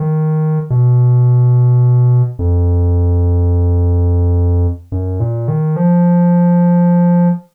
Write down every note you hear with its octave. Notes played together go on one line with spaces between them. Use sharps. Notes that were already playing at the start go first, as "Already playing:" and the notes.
Already playing: D#3
B2
F2
F#2
A#2
D#3
F3